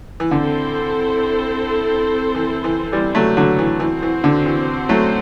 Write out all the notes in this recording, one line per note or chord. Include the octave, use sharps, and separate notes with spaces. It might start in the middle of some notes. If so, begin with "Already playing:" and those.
E3
D3 C4 E4 A4 C5
E3
E3
E3 G3
F#3 A3
D3 F#3
E3
E3 C4 F#4 C5
E3
D3
E3
F#3 A3